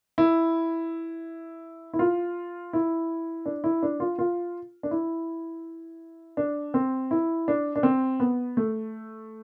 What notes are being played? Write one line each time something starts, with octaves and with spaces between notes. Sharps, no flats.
E4
E4
F4
E4
D4
E4
D4
F4
F4
D4
E4
D4
C4
E4
D4
D4
C4
B3
A3